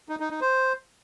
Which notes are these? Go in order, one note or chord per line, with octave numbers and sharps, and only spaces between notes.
D#4
D#4
D#4
C5